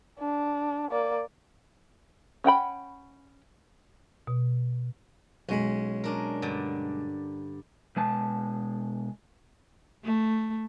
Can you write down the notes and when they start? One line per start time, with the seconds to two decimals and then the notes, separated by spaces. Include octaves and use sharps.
0.19 D4
0.91 A#3 D5
2.44 C#4 F#5 G5 B5
4.27 B2
5.49 B1 G#3 C#4 B5
6.04 C#4 D4 A#4
6.42 G2 D3
7.96 B2 G#3 A5
10.04 A3